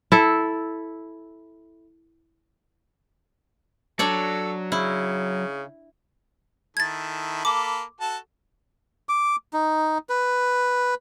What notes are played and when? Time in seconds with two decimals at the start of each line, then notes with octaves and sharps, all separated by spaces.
0.12 E4 A4
3.99 F#3 D4 A4 C#5 D5
4.72 C#3 E4
6.77 D#3 E4 A4 G#6 A6
7.45 A#3 A4 B5 D6
8.01 F#4 A4 A5
9.09 D6
9.53 D#4
10.09 B4